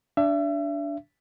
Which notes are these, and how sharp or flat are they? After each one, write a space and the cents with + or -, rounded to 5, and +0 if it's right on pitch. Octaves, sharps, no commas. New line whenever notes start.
D4 -10 E5 +35